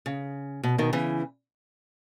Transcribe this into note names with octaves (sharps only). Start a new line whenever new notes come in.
C#3
B2
B2 D#3
C#3 E3